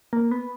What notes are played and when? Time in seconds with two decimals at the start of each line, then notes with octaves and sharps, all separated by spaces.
0.13 A#3
0.31 B3